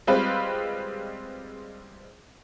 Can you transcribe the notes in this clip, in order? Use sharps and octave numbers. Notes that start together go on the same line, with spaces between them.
G3 G#3 C4 F4 B4 C5